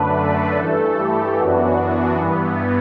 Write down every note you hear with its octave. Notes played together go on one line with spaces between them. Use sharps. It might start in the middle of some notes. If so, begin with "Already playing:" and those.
Already playing: F#2 D3 A3 D4 B4
A4
G2 E3 A3
G4
F#2 E3 B3 D4 F#4
F#4
G2 E3 B3